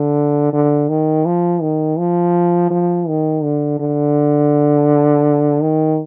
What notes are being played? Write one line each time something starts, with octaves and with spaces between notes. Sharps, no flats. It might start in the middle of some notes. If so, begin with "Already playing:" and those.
Already playing: D3
D3
D#3
F3
D#3
F3
F3
D#3
D3
D3
D#3